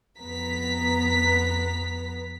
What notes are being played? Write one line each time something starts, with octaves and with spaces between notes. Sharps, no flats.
F2 B3 A#5 B6